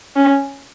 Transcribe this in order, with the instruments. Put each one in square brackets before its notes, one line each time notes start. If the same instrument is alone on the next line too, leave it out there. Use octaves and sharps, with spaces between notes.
[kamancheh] C#4